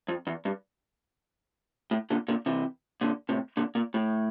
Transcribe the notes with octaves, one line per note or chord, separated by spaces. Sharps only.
F2
E2
G2
A2
A#2 D3
A#2 D3
C3 E3
A#2 D3
A2 C3
A#2 D3
A#2
A2